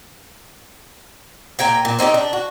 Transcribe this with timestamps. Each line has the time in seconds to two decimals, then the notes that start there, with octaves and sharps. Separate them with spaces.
1.59 A#2 G5 G#5 A#5
1.85 A#2
1.99 C4 D#4 E4 G4
2.14 D4
2.33 F#4